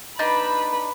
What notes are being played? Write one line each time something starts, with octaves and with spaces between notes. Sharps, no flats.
D4 D#4 B4 A5 B5